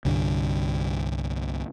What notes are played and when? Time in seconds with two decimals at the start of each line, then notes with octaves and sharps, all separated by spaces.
0.05 C2 G2 D3